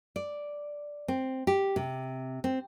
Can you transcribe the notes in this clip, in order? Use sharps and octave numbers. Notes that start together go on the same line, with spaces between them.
D5
C4
G4
C3
C4